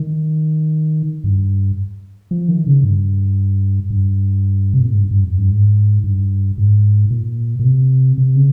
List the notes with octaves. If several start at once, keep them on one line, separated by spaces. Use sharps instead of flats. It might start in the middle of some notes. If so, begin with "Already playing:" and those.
Already playing: D#3
G2
F3
D#3
C#3
G2
G2
C3
A#2
G#2
G2
G2
F2
G2
G#2
G2
G#2
A#2
A#2
C3
C3
C#3